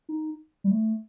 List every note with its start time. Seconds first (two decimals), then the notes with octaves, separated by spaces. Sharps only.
0.09 D#4
0.64 G3
0.71 A3